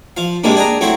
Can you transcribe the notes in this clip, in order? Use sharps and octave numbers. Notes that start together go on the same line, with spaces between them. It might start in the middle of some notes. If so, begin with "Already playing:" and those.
F3 F5
G#2 C3 G#3 A#3 D4
D4 G#4 G5 A#5
F#3 A3 C4 E4 C5